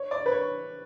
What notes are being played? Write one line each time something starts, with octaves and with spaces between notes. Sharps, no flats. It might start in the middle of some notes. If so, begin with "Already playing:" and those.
Already playing: C#5
D5
B4
C#5